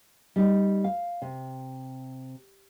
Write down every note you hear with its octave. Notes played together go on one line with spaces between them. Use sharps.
G3 D#4
F5
C3